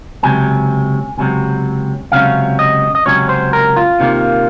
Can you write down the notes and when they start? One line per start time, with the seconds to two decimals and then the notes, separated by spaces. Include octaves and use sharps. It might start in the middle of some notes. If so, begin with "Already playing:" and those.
0.23 C#2 C3 F#3 G#5
1.18 C#2 C3 F#3
2.11 C#2 C3 F#3 C#4 F5
2.59 D#5
2.95 D#5
3.05 C#2 C3 F#3 C#4 C#5
3.29 C5
3.53 A#4
3.77 F4
4.00 C3 D#3 A#3